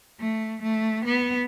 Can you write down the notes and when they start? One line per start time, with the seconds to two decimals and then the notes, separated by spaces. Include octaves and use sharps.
0.20 A3
0.62 A3
1.05 B3